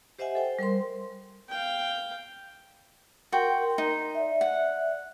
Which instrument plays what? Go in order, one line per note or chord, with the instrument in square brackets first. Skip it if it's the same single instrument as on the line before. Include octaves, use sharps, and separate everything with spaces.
[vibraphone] G4 C5 D#5 E5 F#5 G#5
A4 C5 G5
G3 A#4 C5 C6
[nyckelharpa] F5 G5
[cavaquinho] F#4 G5 [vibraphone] A#4 C6
[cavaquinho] D#4
[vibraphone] D5 E5
[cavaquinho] F#5